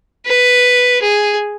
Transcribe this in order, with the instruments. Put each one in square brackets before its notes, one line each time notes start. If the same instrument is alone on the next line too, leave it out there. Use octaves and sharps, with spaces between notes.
[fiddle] B4
G#4